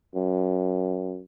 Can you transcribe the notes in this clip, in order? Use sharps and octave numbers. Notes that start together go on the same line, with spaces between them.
F#2